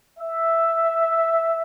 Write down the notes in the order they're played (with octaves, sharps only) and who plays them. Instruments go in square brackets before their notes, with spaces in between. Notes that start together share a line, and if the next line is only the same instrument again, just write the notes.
[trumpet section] E5